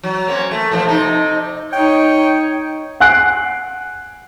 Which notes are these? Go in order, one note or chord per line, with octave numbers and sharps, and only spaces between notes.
F#3
A#3 C4 C#4
A3
A#2 F3
C3 D4 D#4
D#4 C#5 G5
F#5 G#5 F#6 C7 D7